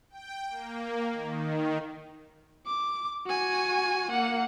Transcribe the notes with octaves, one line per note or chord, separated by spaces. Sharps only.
G5
A#3
D#3
D6
F#4 G#5
A#3 F#5